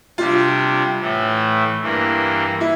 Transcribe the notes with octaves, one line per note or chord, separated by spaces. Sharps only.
C3 G3 D4 F4
A2 E3 A3
G2 E3 A#3
E4